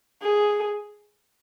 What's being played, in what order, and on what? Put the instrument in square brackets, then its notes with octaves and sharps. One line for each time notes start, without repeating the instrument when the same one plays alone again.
[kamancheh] G#4